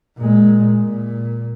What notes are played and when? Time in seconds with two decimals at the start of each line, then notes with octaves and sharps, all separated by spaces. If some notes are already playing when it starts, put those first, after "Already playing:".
0.18 A#2 G#3
0.84 A#2